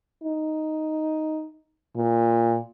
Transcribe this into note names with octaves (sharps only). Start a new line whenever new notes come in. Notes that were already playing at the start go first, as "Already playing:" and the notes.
D#4
A#2